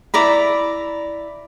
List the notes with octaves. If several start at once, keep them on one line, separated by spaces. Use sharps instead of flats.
E4 D5 A#5 B5